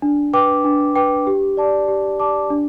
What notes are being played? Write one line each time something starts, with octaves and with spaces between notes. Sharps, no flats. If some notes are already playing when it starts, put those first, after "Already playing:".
D4
B4 G5 D6
D4
B4 G5 D6
G4
D5 A5 D6
G4
D5 A5 D6
D4